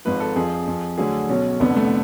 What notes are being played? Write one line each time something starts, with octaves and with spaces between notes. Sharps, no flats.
G#1 G#2 F3 B4
A4
F2 F3 G#4
F2 F3
D2 D3 F#3 G#4
B1 B2 F#3 C#4
F1 F2 D3 B3
A3